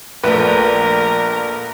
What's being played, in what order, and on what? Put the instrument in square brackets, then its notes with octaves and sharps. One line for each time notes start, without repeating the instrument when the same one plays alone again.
[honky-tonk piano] A#1 [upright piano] A3 B4 [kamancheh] A#4